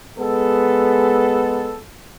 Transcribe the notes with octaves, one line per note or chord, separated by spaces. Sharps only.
G#3 B3 A4